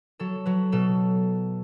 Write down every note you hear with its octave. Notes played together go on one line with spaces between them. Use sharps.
F#3 A4
F#3 B4
B2 A4